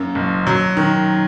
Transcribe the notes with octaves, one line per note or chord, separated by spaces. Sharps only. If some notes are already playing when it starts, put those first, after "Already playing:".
Already playing: F#2 A#3
F#1
F#3
D#3